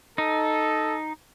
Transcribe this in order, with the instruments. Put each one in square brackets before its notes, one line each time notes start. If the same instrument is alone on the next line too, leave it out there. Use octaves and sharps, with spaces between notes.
[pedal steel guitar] D#4 [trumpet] A4